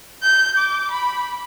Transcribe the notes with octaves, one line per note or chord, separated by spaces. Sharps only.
G6
D6
B5